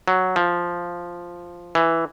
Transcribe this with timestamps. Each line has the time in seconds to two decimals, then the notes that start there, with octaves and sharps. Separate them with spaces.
0.08 F#3
0.36 F3
1.75 E3